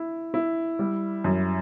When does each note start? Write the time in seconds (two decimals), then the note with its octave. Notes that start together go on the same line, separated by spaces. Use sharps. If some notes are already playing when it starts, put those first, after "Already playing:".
Already playing: E4
0.34 E4
0.79 G3
1.24 F#2